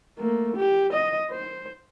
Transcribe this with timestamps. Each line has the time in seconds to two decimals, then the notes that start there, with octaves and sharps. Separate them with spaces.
0.18 A3 A#3
0.57 G4
0.93 D#5
1.31 C5